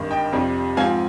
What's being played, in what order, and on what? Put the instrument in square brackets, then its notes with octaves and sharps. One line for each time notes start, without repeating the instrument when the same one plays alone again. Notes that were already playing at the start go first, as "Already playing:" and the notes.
Already playing: [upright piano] G#1 G2 D#3
D#5 G5
F2 C3 G3
G#2 F3 C4 F5 G#5